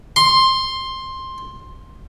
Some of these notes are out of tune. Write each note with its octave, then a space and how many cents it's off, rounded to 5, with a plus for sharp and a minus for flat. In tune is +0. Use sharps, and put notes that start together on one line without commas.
C6 +10